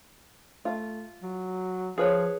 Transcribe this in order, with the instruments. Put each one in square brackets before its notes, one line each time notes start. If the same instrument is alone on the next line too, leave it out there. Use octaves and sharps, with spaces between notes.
[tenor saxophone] A3 [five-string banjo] F4
[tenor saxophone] F#3
[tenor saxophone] F3 [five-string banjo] G#4 B4 C#5